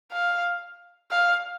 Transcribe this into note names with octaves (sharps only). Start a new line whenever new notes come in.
F5
F5